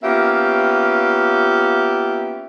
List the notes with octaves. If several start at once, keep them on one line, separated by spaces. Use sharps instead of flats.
A#3 B3 C#4 F4 G4 E5